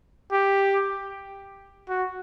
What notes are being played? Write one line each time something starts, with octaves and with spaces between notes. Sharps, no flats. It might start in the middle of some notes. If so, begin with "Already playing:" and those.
G4
F#4